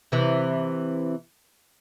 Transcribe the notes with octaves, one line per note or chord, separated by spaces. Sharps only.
C3 E3